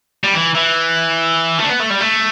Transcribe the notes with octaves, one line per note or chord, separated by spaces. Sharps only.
G3
E3
E3
A3
D4
B3
A3
G3
A3